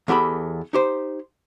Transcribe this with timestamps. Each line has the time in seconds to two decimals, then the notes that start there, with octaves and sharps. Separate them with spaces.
0.08 E2 B3 G4 A4 B5
0.73 D#4 G4 C5